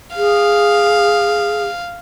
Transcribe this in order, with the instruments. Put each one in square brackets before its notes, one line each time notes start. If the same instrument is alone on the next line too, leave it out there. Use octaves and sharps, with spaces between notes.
[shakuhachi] G#4 [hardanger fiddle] F5